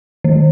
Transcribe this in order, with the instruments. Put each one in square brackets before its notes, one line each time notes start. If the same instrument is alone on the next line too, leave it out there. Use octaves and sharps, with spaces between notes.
[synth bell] D#3